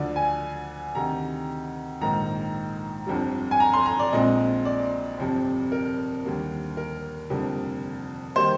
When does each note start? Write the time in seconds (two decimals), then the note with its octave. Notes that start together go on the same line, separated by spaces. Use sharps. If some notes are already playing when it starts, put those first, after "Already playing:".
Already playing: D2 D3 F3 D5
0.16 G#5
0.95 D2 C3 D#3 A#5
2.01 A#1 G#2 D#3 A#3 A#5
3.06 G1 F2 D3 G3
3.51 G#5
3.60 A#5
3.73 C6
3.86 A#5
3.99 D5
4.13 A#1 A#2 G#3 C4 D#5
4.65 D5
5.18 G1 F2 C3
5.72 A#4
6.24 D#2 D3 G3 A#3
6.77 A#4
7.30 F1 F2 D3 G3 A#3
8.36 D#3 G3 A#3 C5